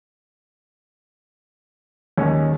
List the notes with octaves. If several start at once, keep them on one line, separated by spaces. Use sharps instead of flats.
D#2 G#3 C#4 C#5